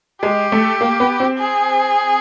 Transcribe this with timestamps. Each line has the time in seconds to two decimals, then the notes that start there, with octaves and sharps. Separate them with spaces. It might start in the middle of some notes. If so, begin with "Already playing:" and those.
0.22 G#3 G4
0.52 A3
0.81 A#3
1.00 B3
1.20 C4
1.38 G#4